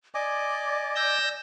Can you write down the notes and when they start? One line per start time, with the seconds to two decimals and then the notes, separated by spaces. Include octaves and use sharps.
0.15 D5 D#5 G#5 D6
0.96 E6 G6 A#6